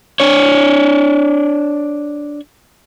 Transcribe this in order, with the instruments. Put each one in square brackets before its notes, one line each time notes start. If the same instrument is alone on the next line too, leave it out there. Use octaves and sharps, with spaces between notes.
[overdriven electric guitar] D4 C#5